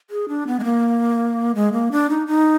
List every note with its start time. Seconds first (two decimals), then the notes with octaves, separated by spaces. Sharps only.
0.10 G#4
0.28 D4
0.47 B3
0.60 G#3
0.64 A#3
1.55 G#3
1.73 A#3
1.92 D4
2.10 D#4
2.27 D#4